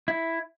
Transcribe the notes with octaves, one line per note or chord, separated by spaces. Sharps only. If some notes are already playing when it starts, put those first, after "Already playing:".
E4